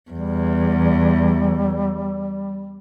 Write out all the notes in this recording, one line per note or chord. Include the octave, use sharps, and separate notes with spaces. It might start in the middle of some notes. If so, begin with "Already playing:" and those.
E2 G3